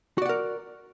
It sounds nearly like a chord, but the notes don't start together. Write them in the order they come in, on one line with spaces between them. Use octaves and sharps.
F#4 D5 F#5 A#4